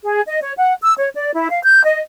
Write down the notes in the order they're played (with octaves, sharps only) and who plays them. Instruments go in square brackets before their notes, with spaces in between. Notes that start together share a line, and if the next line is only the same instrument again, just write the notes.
[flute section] G#4
D#5
C#5
F#5
E6
C#5
D5
E4
F5
G6
D#5